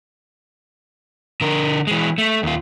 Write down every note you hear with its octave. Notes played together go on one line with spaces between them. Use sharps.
D3 A#4
E3 G#3
A3
D#2 F4